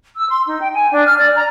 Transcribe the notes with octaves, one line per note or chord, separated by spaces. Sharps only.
E6
C6
D#4
G5
G#5
D4
F6
D5
A#5